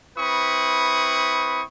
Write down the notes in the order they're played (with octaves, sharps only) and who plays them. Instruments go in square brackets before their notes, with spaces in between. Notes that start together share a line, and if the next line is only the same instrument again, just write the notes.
[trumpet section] C4 E4 B4 B5 C#6 D#6